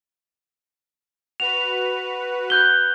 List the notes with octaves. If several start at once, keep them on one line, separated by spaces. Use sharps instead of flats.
F#4 B4 F7
F#6 G6 G7